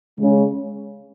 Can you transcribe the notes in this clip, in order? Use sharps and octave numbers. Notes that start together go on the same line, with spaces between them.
C#3 G#3 C#4